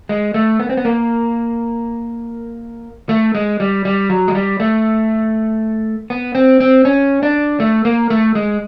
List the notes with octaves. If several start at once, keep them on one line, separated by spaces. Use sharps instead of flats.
G#3
A3
B3
C4
B3
A#3
A3
G#3
G3
G3
F#3
G#3
G3
A3
B3
C4
C4
C#4
D4
A3
A#3
A3
G#3